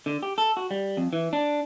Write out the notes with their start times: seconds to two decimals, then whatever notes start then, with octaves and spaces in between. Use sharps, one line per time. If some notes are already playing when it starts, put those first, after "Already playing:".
0.06 D3
0.23 G4
0.38 A4
0.57 F#4
0.71 G3
0.97 F2
1.13 E3
1.33 D4